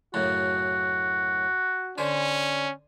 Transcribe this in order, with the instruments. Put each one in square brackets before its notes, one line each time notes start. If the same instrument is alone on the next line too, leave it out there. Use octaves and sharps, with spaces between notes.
[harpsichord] F#2 A2 C#3 [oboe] F#4
[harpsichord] D3 C5 G#5 [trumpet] C#4